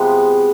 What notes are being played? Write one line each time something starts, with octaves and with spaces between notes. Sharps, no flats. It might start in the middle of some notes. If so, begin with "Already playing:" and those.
Already playing: C3 F3 G#3 B3